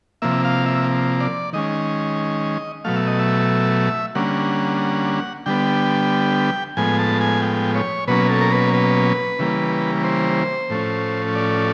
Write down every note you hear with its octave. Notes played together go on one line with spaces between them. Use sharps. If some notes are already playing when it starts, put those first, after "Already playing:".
C3 F3 A#3 E5
F5
E5
D5
D#3 G#3 C#4 D#5
B2 F#3 A3 F5
E5
D#5
E5
D3 G3 A#3 C#4 F#5
D3 G3 B3 G5
A2 F3 G#3 B3 G#5
A5
G#5
G5
C#5
B2 F#3 A#3 C#4 B4
A4
A#4
B4
B4
C#3 E3 G3 A#3
C5
A2 F3 A3 C#4
D5